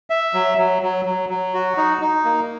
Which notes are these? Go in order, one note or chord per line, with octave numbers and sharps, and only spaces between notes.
E5
F#3
F#3
F#3
F#3
F#3
F#4
D#4
D#4
A#3